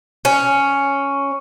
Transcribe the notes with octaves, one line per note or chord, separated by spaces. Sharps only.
C#4